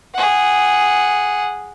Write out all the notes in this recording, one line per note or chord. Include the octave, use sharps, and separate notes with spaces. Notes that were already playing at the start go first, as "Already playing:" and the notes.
G#4 F#5